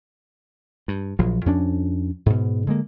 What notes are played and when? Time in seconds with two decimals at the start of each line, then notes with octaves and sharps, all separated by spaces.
0.88 G2
1.19 A#1 F3 F#3
1.46 F2 C#4 D4
2.26 G#2 B2
2.67 D3 G#3 A#3